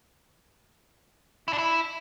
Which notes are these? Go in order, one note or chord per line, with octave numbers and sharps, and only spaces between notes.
E4
D4
E4